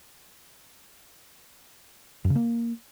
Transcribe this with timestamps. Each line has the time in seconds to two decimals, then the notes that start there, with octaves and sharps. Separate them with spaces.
2.25 F#2
2.30 C#3
2.35 A#3